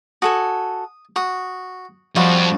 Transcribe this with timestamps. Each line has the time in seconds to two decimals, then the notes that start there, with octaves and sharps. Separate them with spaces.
0.22 F#4 A4 G#5 D#6
1.16 F#4 D#6
2.16 F2 F3 G3 F4 F#4